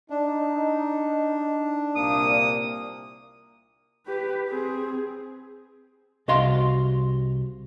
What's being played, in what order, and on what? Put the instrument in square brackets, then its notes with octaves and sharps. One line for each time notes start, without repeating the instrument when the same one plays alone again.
[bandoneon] D4 [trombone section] D#4
[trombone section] C2 A#2 A#3 [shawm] D#6
[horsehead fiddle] G4 B4
C4 G#4
[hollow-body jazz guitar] C2 F#4 D#5 F5 C6